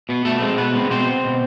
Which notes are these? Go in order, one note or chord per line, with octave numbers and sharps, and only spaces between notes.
B2 B3
B2 A3 A4
G#3 C4
B2 B3 B4
G#3 C4
B2 C4 C5
B3
B2